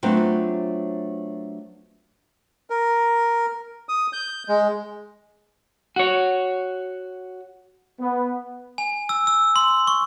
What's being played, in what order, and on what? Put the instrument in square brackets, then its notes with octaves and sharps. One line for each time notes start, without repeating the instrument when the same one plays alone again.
[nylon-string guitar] F#3 A3 B3 C4 D4 F4
[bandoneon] A#4
D#6
G6
G#3
[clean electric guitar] F#4 C#5
[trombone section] B3
[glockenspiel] G#5
E6
E6
C6
C#6